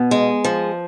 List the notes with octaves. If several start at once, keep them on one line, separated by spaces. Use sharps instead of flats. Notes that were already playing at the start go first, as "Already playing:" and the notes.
Already playing: B2
G#3
F3